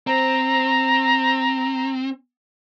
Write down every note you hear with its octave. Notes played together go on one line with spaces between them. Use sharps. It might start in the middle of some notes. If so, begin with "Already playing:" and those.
C4 A#5